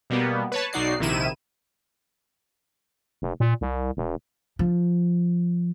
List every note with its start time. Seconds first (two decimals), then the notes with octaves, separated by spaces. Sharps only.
0.10 B2 G3 A#3 B3
0.52 B4 C#5 A5
0.73 B1 D#4 F#4 D5 C7
0.99 A#1 C3 D#3 E4 D#7 E7
3.22 F1
3.40 A#2
3.61 C2
3.97 E1
4.59 F3